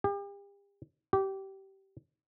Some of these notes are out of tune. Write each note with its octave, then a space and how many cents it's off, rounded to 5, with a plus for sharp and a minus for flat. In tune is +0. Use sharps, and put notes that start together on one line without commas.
G4 +40
G4 -20